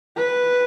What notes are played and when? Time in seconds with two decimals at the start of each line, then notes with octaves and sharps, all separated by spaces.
0.17 B4